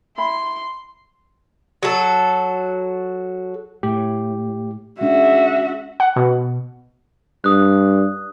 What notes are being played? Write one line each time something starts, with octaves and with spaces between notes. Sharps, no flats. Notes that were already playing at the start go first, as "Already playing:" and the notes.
E4 E5 B5 C6
F#3 A4
A2 G4
G#3 C#4 D4 F#4 E5
F#5
B2
G2 D#6 F#6